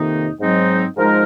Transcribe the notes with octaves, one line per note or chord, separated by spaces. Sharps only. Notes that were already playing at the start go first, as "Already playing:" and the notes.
Already playing: F2 C3 D#3 A#3 D#4
G#2 F#3 C4 D#4
G#2 F3 G#3 D#4 A#4